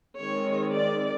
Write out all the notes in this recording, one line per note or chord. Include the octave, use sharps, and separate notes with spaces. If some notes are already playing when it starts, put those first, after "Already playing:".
D#3 G#3 C4 C#5
D5